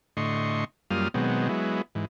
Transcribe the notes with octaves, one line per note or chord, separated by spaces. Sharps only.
A2 D3 D#5 C6 C#6
F#2 G3 A#3 F4 D#6 F6
B2 D#3 F#3 G#3 B3 C4
F#3 G#3 B3 E4
G#2 E3